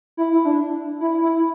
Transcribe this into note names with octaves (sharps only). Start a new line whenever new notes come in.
E4
E4
D4
E4
E4